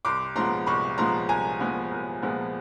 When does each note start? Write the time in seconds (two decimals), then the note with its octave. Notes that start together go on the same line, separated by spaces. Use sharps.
0.05 C2 C6 D6
0.36 A#2 F3 G#3 B3 A#5 C6
0.66 C2 B5 C#6
0.98 A#2 F3 G#3 B3 A#5 C6
1.29 C2 G#5 A#5
1.60 A#2 F3 G#3 B3
1.91 C2
2.22 A#2 F3 G#3 B3